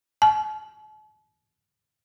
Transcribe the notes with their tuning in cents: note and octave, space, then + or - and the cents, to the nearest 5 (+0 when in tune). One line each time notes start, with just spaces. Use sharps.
A5 -45